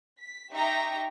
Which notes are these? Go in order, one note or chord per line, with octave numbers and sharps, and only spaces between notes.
B6
D#4 G4 E5 G5 A#5 C#6